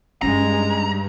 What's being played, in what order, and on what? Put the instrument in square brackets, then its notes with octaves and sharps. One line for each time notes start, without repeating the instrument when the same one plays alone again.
[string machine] G2 [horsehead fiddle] G#3 [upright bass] C#4 D#4 [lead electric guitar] A#5